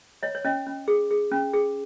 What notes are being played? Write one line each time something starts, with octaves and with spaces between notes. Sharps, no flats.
C#5 D#5
C#5
C#4 D#5
C#4
G#4
G#4
C#4
G#4